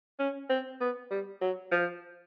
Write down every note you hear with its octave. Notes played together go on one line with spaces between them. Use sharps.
C#4
C4
B3
G3
F#3
F3